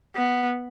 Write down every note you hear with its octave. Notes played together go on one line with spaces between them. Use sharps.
B3